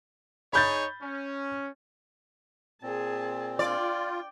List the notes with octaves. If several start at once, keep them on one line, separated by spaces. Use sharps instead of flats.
D#4 G#4 C#5 B5 G6 A6
C#4
A#2 C4 G#4 A5
F4 D5 G5